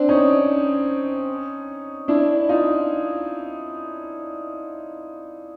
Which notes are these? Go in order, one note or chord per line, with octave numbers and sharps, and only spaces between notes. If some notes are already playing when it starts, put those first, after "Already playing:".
Already playing: C4 D4
C#4 D#4
D4 E4
D#4 F4